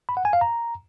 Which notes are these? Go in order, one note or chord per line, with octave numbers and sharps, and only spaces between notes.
B5
F#5
G#5
F5
A#5